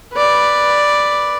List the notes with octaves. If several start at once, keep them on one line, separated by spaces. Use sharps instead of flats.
B4 D5